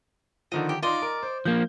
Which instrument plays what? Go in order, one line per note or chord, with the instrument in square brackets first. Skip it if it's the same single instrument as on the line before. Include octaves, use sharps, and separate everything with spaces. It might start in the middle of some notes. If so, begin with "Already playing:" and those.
[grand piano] D3 D#3 F3 [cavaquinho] D#5
[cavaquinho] G4
[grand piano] D#4 F4 [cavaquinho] D5 D#5 C6
[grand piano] A#4
C5
[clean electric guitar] F3 A#3 [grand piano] G6